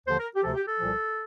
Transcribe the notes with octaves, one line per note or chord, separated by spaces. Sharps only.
D#2 D3 F3 C5
A#4
G4
D2 C3 F3 A4
G4
A4
C2 A#2 F3